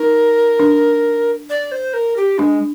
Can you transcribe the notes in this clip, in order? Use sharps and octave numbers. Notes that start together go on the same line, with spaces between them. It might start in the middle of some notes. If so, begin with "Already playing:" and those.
Already playing: D#4 A#4
D4
D5
C5
A#4
G4
G#3 D4